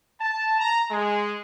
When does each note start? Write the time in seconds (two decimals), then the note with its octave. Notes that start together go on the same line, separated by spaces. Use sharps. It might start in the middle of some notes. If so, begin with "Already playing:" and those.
0.21 A5
0.60 A#5
0.91 G#3